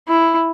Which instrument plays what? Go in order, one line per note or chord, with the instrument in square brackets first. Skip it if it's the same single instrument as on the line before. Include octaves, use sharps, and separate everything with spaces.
[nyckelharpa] E4